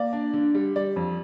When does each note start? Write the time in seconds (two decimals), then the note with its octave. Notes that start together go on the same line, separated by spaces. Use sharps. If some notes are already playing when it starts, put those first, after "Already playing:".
Already playing: A#3 D5
0.13 D4
0.33 D3
0.55 G3
0.76 G3 D5
0.96 F2